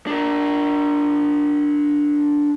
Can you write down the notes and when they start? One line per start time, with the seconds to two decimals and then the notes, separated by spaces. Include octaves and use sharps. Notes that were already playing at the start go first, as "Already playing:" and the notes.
0.07 D4 A#4